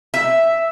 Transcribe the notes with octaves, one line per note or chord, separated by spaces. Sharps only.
E5